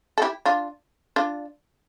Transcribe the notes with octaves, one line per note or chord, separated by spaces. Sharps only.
A4
E4 G4
D4 F4
D4 F4